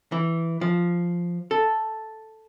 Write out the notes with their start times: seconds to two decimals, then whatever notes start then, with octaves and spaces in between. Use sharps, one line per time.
0.12 E3
0.61 F3
1.51 A4